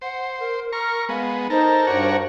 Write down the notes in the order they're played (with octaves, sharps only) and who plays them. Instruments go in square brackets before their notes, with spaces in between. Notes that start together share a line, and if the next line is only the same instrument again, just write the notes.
[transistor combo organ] C5 [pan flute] F#5
[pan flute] A#4
[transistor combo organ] A#4 C#6 [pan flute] F6
[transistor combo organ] G#3 B3 [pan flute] F5
[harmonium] D#4 [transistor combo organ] A4 A#4 [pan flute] C5
[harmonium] G2 D5 [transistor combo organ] F#4 A#4 C#5